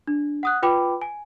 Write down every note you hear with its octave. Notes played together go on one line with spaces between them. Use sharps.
D4
F#5 D#6 F#6
F4 B4 G5 B5 D6
G#5